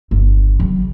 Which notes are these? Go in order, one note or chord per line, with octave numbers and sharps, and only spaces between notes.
G1 G2
C#3 F#3